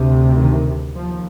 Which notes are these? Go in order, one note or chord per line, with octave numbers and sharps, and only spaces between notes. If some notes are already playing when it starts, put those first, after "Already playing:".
Already playing: D2 C3
D#3
D#2 F3